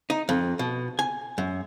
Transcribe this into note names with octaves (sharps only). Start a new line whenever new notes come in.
D#4
F2
B2
G#5
F#2